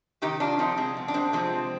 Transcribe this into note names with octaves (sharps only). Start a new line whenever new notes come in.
C3 D#3 D#4 G4
D4 F4
C3 F3 C4 D#4
G#3 C4
B2
D4
G#3 C4
C3 F3 G#3 C4